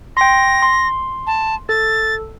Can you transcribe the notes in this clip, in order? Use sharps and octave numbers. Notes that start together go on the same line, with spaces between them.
G5 C6 A#6
C6
A5
A4 A6